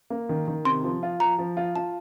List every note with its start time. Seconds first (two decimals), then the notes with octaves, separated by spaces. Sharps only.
0.10 A#3
0.29 D#3
0.48 D#3
0.65 C3 C6
0.84 F3
1.03 F4
1.20 F3 A#5
1.38 F3
1.57 F4
1.76 F4 A5